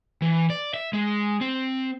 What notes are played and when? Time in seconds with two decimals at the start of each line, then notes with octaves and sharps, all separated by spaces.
0.22 E3
0.50 D5
0.74 E5
0.93 G#3
1.41 C4